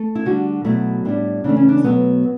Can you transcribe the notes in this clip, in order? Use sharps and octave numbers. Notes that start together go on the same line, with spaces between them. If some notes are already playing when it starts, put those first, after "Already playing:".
Already playing: A3 A4
E4
D3 G3 F#4
B2 F#3 A3 E4
A2 G3 D4
C#3 E3 A3 D4
C#4
D4
B2 F#3 A3 B3